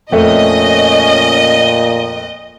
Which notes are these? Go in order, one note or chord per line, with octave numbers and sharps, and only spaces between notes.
F2 A#2 A3 C#4 D#5